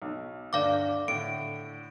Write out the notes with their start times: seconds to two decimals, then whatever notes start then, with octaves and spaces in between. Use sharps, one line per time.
0.02 B1
0.53 G1 D2 D5 F5 D6
1.08 A2 D3 D7